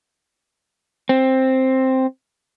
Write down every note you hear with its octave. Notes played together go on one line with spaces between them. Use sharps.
C4